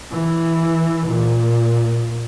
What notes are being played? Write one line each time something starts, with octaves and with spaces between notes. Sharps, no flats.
E3
A#2